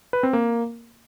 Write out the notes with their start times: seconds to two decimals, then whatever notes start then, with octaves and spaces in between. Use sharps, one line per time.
0.13 B4
0.23 C4
0.33 A#3